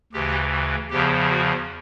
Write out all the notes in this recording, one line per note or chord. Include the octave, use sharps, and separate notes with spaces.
D2 C#3 E3 G4
E2 C#3 F3 G4
F#4